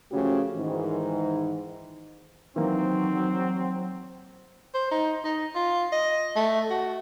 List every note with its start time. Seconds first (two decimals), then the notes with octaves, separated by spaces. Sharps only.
0.11 C#3 F3 A3 C#4 F#4 G4
0.56 G#2 D#3 E3
2.56 D#3 E3 F#3 A#3 C4
4.74 C5
4.91 D#4
5.25 D#4
5.55 F4
5.93 D#5
6.36 A3
6.70 F#4